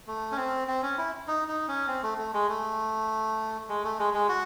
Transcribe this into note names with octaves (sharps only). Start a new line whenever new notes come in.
A3
C#4
C4
C4
C#4
E4
D#4
D#4
C#4
C4
A3
A3
G#3
A3
G#3
A3
G#3
G#3
F#4